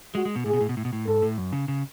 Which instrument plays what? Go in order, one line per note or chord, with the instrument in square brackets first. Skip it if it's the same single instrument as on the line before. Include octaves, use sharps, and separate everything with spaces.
[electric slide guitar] G#3 [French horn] F#4
[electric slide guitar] G#3
B2
[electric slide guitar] A2 [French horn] G#4
[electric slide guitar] B2
A2
B2
A2
B2
A2
[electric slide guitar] G#2 [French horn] A4
[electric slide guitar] A2
F#2
C#3
C#3